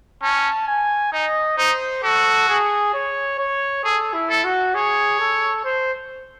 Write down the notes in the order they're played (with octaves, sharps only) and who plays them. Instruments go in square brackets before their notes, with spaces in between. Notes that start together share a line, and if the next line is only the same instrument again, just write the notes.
[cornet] C#4 [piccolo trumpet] A5
[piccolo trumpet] G#5
[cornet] D#4 [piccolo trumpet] D#5
[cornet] D#4 [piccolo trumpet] C5
[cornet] F#4 [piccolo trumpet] A4
[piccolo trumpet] G#4
C#5
C#5
[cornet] G#4 [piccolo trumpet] A4
[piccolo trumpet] E4
[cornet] A4
[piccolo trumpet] F#4
[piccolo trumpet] G#4 [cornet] C#5
[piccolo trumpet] A4
C5